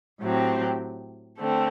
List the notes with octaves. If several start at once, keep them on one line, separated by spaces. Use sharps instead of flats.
A2 F#3 C4 G4
D3 A3 C4